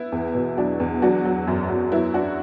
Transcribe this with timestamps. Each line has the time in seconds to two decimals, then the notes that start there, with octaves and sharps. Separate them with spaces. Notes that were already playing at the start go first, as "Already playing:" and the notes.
Already playing: B3 E4
0.12 E2
0.35 B2
0.57 F#3 D4 F#4
0.80 E2
1.02 F#3 D4 F#4
1.25 F#3
1.47 F#2
1.70 F#2
1.92 F#3 B3 E4
2.14 F#3 D4 F#4